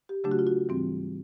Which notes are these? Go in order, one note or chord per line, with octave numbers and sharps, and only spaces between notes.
G4
C#3 F#3 A3 D4 G4
F#4
F4
F#4
G#2 E3 G3 C4